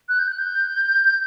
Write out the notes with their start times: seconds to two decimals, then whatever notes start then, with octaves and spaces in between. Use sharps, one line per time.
0.09 F#6
0.19 G6
0.28 F#6
0.38 G6